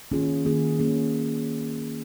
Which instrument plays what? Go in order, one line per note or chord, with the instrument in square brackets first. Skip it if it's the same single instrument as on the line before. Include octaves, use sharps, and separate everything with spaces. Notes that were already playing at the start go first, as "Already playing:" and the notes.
[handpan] D#3 A#3 C#4 F4 G#4
D#3 A#3 C#4 F4 G#4
D#3 A#3 C#4 G#4